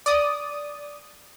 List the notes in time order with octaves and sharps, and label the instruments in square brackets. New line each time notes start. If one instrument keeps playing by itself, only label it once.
[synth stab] D5 D#6